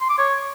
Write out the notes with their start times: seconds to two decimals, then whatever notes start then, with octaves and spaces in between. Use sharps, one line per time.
0.01 C6
0.09 D6
0.18 C#5